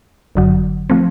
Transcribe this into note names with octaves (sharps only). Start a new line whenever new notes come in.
G1 F#2 D3 F#3
F3 A3 C4